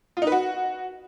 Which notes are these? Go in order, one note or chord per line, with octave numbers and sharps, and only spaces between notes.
F4
D#4
B4
F#4